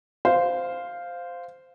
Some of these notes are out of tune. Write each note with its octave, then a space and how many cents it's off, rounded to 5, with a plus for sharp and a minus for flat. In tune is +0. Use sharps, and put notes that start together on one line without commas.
C5 -10 F5 +0